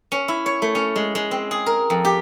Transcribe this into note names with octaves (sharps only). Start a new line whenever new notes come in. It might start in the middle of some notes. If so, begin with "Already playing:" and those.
C#4
E4
C#5
A3
C#4
G#3
G#3
C4
G#4
A#4
F2
G4